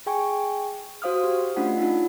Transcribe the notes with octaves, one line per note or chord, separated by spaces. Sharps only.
G#4 G5 G#5 C#6
F#4 C5 F5 D#6 F6
G4
A3 C#4 D4 F4 F#5
D4 D#4 F4